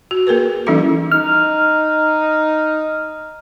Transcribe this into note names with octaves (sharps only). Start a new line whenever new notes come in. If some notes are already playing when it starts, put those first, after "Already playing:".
F#4
A#3 G#4 A#4 B4
E3 G3 C#4 D#4 E4 A4
D#4 F6